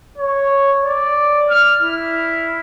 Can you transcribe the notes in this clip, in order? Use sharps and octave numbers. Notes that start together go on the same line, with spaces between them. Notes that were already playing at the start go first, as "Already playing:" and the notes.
C#5
D5
F6
E4